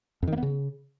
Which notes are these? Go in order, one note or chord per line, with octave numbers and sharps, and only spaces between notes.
F2
D#3
A#3
B3
C#3